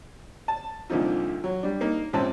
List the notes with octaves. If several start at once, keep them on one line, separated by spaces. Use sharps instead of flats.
A5
C2 A#2 D3 F3 D#4 F4
F#3
G3 D4
A#3 D#4
A#1 G#2 C4 C#4 A5